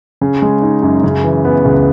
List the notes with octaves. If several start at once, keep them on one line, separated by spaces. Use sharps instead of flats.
C#3
G#3
D#4
F#2
C#3
E3
B3
C#2